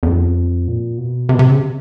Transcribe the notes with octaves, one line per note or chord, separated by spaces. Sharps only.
E2
F2
A#2
B2
C3
B2
C3
C#3